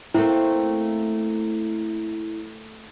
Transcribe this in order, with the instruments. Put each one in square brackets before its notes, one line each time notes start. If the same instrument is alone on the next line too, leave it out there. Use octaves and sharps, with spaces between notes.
[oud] A3 A#3 C4 [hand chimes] E4